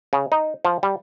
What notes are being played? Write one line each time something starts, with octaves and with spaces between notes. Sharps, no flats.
C#3
D#4
F3
G3